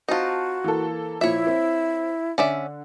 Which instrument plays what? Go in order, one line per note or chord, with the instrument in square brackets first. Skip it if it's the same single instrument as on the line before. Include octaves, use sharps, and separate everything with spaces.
[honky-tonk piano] C4 A5 [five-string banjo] D#4 F4 [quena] F#4
[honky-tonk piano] E3 A#3 A4
[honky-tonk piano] A#2 F3 [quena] E4 [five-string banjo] C#5 E5
[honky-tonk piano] C4
[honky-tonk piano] D3 [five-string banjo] C#4 D5 E5